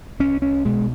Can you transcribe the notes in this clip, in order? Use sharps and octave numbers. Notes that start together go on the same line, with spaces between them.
C2 C#4
C#4
B2 G#3